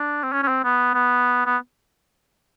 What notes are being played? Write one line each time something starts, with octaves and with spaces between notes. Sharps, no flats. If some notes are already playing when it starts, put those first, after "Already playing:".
Already playing: D4
C4
C#4
C#4
C4
B3
B3
B3